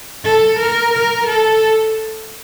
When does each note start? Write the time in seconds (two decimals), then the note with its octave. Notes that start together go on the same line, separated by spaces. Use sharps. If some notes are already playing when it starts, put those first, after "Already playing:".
0.25 A4
0.59 A#4
0.94 A#4
1.27 A4